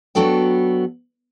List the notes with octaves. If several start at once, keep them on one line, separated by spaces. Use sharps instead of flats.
F#3 B3 D4 F#4 A4 G5